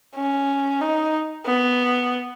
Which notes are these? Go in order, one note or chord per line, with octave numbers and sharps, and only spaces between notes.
C#4
D#4
B3